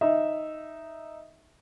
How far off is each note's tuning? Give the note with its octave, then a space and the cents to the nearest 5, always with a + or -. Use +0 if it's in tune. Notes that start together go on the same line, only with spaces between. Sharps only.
D#4 +0 E5 +0